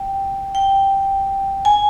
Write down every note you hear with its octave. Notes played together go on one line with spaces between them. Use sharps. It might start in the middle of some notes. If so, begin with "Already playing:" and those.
Already playing: G5
G5
G#5